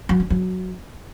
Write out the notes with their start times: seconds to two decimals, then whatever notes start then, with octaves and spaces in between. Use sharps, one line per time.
0.09 F#3
0.20 D4
0.30 F#3